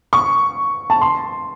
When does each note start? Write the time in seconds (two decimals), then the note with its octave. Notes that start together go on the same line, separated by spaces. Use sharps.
0.13 C#6
0.90 A5
1.01 C6